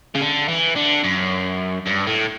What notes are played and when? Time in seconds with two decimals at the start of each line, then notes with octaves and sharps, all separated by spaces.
0.15 C#3
0.21 D3
0.48 E3
0.76 D3
1.04 F#2
1.86 G2
2.07 A2